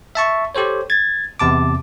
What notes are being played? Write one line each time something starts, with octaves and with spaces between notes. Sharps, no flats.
E5 A5 C#6
G4 A4 C5 C#5
G#6 A6
E2 C3 A5 D6